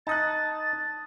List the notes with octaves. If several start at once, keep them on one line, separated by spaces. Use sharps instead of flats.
D#4 A5 D#6 F#6 A6